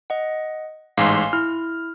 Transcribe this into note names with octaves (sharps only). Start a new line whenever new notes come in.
D#5 F#5
A1 G#2 F5 G#5 C6
E4 F6